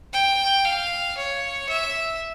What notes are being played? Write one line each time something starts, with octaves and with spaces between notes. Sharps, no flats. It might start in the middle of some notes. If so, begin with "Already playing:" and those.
G5
F5
C#5
E5